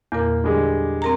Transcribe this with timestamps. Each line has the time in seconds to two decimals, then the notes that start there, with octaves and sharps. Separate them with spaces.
0.12 E2 A#2 A#3 A#4
0.44 D3 G3 G#3
1.02 C4 A#4 A#5